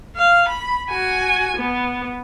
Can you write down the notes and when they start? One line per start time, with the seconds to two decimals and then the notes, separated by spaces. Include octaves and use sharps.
0.16 F5
0.49 B5
0.89 F#4 G#5
1.56 B3